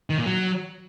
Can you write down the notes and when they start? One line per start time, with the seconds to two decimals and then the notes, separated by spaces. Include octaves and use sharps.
0.10 D#3
0.18 A#2
0.26 F#3